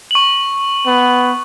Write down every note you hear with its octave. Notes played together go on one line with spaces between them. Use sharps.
C#6 F#7
B3